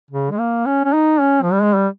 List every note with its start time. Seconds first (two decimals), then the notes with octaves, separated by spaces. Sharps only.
0.11 C#3
0.31 G#3
0.39 A#3
0.66 C#4
0.85 C#4
0.93 D#4
1.20 C#4
1.42 F3
1.52 G3
1.62 G#3
1.75 G3